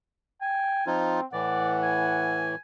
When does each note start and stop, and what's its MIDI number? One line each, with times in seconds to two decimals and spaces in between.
0.42 0.82 79
0.42 0.98 80
0.87 1.21 53
0.87 1.25 60
0.87 1.21 63
0.87 1.21 65
1.33 2.55 45
1.33 2.55 52
1.33 1.77 74
1.33 2.43 78
1.83 2.57 80